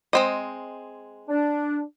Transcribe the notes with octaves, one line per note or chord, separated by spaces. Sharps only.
G#3 C4 D#5
D4